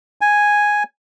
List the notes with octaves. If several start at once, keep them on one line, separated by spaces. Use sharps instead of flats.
G#5